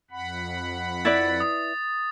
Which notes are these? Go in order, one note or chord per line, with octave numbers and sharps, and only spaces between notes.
F2 F#5 B5
E4 B4 D5 A6
D#6